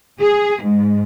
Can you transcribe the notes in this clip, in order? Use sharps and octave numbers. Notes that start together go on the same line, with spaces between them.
G#4
G#2